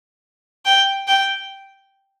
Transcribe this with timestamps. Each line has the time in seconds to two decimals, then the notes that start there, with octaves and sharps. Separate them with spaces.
0.66 G5
1.08 G5